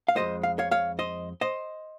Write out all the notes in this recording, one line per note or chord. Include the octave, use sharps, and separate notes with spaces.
F5
F2 C#3 G#3 C5 D#5
F5
C#5 F5
C#5 F5
C5 D#5
C5 D#5